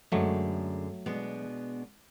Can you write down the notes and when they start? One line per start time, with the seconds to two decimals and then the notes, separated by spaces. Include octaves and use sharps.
0.12 F#2 D3 F#3 G#3 A3
1.06 B2 G#3 B3 D4